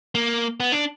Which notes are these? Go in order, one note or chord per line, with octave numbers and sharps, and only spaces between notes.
A#3
B3
D4